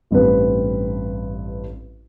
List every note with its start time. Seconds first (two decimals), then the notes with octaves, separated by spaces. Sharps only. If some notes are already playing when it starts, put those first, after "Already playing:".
0.11 A1 G2 C4 B4